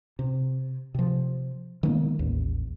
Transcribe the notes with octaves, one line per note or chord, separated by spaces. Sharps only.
C3
C3 F3
D#3 G#3 A#3 B3
A1 D#2